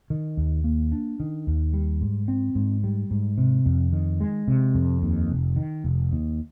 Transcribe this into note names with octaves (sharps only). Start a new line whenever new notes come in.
D#3
D#2
A#3
D4
D#3
D#2
G3
G#2
C4
G#2
G3
G#2
C3
F2
D#3
G#3
C3
F2
D#2
F1
D#3
F1
D#2